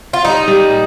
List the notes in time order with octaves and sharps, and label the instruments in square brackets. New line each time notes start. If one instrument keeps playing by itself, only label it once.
[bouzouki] F4
[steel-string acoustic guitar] G3 [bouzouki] D#4
[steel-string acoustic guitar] G3
A#2